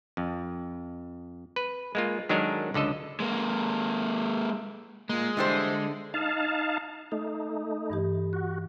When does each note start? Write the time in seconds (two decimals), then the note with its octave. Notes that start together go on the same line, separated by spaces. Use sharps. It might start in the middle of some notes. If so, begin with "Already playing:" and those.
0.17 F2
1.56 B4
1.95 G#3 A#3 F4
2.29 D#3 F#3 G#3 D4 A4 A#4
2.74 C#2 D3 A4 D#5
3.20 G#3 A#3
5.09 G#3 A#3 F4
5.37 D3 E3 G3 D4 A4 C5
6.14 D#4 F5 A5
7.12 A3 D#4
7.90 G2 E3 G4
8.33 F#4